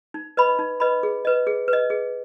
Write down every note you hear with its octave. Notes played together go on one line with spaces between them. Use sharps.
D#4
B4 D#5 B5
D#4
B4 D#5 B5
G#4
B4 D#5
G#4
B4
D#5
G#4